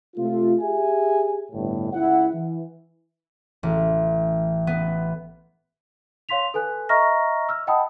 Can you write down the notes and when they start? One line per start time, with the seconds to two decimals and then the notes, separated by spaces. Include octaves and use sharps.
0.16 C3 A3 F4
0.62 G4 G#4 E5 G#5
1.52 G1 A2
1.93 C#2 E4 F#5
2.34 E3
3.63 A1
4.67 B3
6.29 C#5 F5 C6 B6 F7
6.54 A4 B4 G#5 F#6
6.89 D#5 E5 A#5 C#6 F6 A#6
7.49 E6 F6
7.67 D#5 F#5 G5 A5 B5 D#6